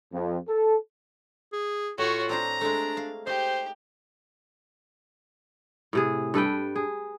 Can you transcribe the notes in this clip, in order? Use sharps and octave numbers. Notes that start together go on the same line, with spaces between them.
F2
A4
G#4
A2 F4 F#4 C#5 F#5
C4 D4 C5 A#5
G#3 A3 D4
F5
D#4 G4 C5
A2 C3 G#4
G2 A4 B4 G5
G#4